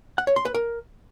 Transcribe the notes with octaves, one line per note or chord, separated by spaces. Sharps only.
F#5
C#5
C6
B4
A#4